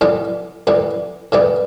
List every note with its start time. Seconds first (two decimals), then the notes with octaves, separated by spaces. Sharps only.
0.01 A2 E3 G3 B3
0.67 A2 E3 G3 B3
1.32 A2 E3 G3 B3